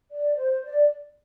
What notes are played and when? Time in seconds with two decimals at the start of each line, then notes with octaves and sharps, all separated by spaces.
0.11 D5
0.36 C5
0.64 D5